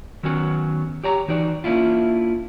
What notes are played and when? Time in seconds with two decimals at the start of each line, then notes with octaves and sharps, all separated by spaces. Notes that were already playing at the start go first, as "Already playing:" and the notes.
0.23 D#3 F#3 B3 C#4 F#4
1.04 G4 C#5 A#5
1.28 E3 D#4 F#4 D5
1.64 A#3 C#4 D4 E4 F4